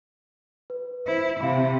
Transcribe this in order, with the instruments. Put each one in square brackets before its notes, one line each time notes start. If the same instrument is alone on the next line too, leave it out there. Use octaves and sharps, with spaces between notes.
[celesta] B4
[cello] E4 [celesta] C5
[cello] C3 [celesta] E5 F5 B5